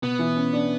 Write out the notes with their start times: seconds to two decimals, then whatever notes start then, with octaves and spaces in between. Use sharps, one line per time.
0.02 B2 B3
0.19 E3
0.36 C#4
0.53 D4